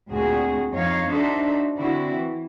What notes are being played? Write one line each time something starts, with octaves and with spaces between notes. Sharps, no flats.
D2 A#2 C4 F#4 G#4
F2 F3 D#4 C#5 F5
D4 D#4 F#4 A4 C5 E5
D3 C4 E4 F#4
E3